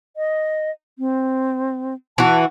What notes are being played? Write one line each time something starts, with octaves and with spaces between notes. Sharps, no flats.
D#5
C4
E3 F#4 A5